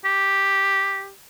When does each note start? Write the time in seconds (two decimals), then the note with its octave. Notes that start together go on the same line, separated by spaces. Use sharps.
0.05 G4